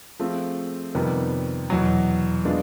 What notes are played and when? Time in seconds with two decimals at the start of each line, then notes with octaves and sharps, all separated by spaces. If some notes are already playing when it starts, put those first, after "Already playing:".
0.19 F3 A3 C4 F4 G#4
0.95 F2 C3 D#3 G3 B3
1.70 E2 B2 F#3
2.45 G#3 B3 D4 F4